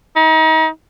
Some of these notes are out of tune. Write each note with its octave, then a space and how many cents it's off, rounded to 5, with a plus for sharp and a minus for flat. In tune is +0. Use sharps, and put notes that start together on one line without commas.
D#4 +35